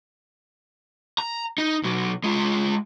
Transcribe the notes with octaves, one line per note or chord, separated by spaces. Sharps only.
A#5
D#4
B1 F#3
G#3 F4